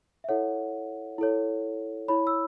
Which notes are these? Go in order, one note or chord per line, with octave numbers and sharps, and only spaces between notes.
E5
E4 A4 C#5 F#5
E4 A4 C#5
E4 C#5 B5
E6